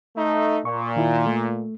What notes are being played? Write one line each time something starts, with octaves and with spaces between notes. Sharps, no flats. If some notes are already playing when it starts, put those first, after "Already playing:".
A3 D#4
A#2 C#6
D#3 E4 F4
A3